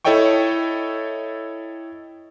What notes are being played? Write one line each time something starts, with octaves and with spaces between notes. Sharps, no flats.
E4 A4 C#5 D#5 G5 C#6